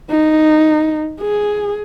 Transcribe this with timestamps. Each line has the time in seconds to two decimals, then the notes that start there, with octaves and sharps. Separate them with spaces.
0.10 D#4
1.21 G#4